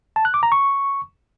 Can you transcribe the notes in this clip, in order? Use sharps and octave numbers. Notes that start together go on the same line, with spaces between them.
A5
F#6
D6
A#5
C#6